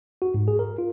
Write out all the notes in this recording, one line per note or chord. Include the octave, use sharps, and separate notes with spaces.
F#4
G#2
G#4
A#4
F4